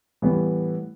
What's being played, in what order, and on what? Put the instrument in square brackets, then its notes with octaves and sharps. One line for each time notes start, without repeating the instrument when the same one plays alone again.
[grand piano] A2 E3 G3 B3